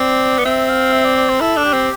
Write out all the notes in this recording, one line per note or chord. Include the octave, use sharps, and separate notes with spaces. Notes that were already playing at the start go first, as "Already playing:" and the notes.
Already playing: C4 D5
B3
C4 E5
F5
E5
D5
D5
C5
E4 A4
D4
G4
C4